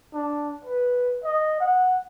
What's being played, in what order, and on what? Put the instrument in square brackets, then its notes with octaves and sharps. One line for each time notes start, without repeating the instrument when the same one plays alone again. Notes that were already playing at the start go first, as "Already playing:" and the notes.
[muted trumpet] D4
B4
D#5
F#5